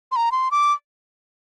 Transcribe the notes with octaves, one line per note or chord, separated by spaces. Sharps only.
C6
A#5
C6
D6